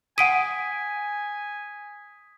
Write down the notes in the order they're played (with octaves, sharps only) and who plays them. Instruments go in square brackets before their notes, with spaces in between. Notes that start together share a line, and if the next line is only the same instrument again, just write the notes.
[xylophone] F#5 D7 D#7 [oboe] G#5 [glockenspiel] D#6 B6